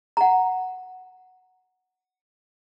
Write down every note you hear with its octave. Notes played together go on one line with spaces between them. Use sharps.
F#5 A#5